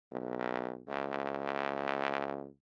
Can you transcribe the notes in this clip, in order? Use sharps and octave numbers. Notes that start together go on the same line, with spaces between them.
B1
C#2